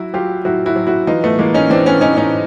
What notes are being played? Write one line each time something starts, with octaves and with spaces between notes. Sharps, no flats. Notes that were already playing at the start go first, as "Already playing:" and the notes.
Already playing: F#3 E4 F#4
F#3 F4 G4
F#3 E4 F#4
E4 F#4
F#3
E4 F#4
E3 D#4 F4
A3 B3
E3 G#3 A#3
C#4 D#4
E3 C4 D4
B3 C#4
E3 C#4 D#4
C#4 D#4